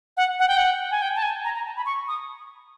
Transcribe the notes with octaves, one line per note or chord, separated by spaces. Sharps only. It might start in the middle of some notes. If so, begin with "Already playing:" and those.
F#5
F#5
G5
F#5
G#5
G5
A5
G#5
A#5
A#5
A5
B5
C#6
D#6